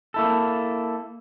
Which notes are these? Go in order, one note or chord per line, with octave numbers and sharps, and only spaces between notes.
A#3 E4 A4